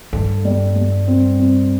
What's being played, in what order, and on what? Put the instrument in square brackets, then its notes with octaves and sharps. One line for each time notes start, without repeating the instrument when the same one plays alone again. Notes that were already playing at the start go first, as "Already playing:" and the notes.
[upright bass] G2 [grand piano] A4
[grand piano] G3
G3
C4
C4